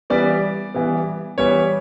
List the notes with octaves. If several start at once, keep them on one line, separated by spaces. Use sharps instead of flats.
E3 G3 B3 D5
E3 G3 B3
E3 G3 B3 C#5